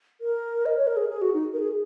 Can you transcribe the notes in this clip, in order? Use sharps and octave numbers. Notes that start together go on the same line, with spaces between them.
A#4
D#5
C#5
A#4
G#4
G#4
F#4
D#4
A#4
G#4